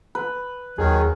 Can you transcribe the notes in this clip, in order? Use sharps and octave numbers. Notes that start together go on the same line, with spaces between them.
B4
D#2 D#3 F#3 G#4